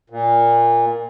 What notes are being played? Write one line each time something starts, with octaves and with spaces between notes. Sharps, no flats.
A#2